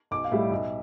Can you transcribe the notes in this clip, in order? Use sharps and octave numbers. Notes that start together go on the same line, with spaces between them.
B1 D6
F5
A2 G3 E5
B1